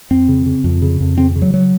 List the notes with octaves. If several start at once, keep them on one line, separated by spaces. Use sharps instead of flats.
F2 C4
C#3
C#3
F2
C#3
F2
C#3 C4
C#3
F#3
F#3